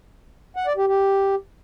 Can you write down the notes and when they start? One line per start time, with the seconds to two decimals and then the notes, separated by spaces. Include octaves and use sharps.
0.56 F#5
0.67 D5
0.77 G4
0.87 G4